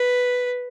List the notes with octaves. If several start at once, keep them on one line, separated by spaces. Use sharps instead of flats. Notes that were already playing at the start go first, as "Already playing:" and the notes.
Already playing: B4